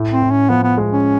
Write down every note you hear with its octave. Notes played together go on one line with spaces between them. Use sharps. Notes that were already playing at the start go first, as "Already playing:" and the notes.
Already playing: A2
C4
A2
C#4
F3 B3
B3
G#3
C#4